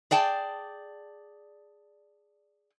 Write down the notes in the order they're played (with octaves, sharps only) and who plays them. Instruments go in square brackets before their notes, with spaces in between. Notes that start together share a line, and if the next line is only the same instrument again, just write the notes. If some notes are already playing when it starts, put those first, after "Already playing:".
[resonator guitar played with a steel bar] G#4 D5 G5 A5